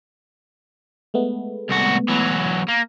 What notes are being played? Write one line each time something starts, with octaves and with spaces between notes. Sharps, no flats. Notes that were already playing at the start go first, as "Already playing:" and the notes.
G#3 A3 B3
C2 F#4
E3 F#3
A#3